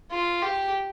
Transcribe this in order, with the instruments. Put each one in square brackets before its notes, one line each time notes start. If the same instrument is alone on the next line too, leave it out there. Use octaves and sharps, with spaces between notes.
[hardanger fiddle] F4
G4